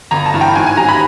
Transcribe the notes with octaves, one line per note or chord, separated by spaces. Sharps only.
G1 A#5
A5
G2 E3
G5
G#2 G#5
G#5
D#3 G3 A#5
B5